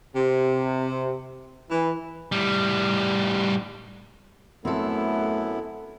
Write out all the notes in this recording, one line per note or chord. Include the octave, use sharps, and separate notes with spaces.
C3
E3
A2 G3
F#2 A3 B3 C4 E4 A4